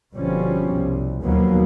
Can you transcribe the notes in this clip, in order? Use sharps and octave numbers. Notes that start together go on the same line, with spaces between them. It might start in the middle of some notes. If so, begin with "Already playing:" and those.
G1 B2 F3 G3 C4 C#4
C2
D#2 B2 F3 F#3 A#3 B3